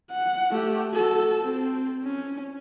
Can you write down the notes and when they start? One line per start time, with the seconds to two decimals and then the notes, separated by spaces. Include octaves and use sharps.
0.11 F#5
0.51 A3 G4
0.90 F#4 A4
1.40 C4
2.04 C#4